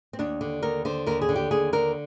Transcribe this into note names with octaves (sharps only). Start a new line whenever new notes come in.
C4
D#2 D4
D3
D#2 A#4
D3 C5
D#2 A#4
G#4
D3
G4
D#2 G#4
D3 A#4